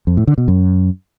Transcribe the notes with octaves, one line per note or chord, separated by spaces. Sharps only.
F2
A2
D3
B2
F#2